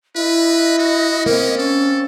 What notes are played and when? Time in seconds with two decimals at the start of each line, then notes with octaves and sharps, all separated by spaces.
0.16 E4 B4 D#5
0.78 F#4
1.26 A#3 C4 C#4
1.58 C#4 A4